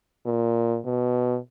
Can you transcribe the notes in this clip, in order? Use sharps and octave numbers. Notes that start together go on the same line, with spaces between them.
A#2
B2